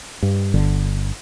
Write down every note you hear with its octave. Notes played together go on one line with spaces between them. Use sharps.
G2
G1 D3